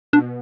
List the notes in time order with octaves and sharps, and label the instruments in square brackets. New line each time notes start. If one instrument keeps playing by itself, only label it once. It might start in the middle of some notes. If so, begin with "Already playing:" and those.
[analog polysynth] B2 [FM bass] D4